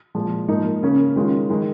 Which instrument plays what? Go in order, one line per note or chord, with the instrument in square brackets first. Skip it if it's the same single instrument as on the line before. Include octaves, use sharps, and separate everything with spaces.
[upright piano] A#2 F3 G#3
G#2 F3 A#3 D#4
C#3 A#3 C#4
D#3 G#3 C#4 F4
D#3 G#3 D#4